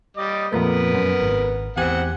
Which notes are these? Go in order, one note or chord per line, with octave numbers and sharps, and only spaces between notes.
G3 D#5 D6
F2 A#2 A3 B3 A#4 B4
F#2
G#1
E2 C4 G4 F#5 G#5